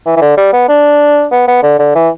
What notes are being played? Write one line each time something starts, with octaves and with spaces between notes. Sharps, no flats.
E3
E3
D3
G3
B3
D4
B3
B3
D3
D3
E3